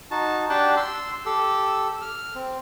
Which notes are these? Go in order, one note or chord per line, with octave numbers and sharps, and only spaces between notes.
D#4 F#4 A5
D4 G4 F#5 G5 A5
C6 E6
G4 A4 E6
F6
C4